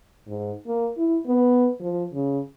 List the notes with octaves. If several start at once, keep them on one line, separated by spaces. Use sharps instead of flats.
G#2
A#3
E4
B3
F3
C#3